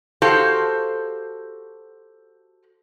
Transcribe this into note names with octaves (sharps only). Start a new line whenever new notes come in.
F#4 G4 A4 C5 F5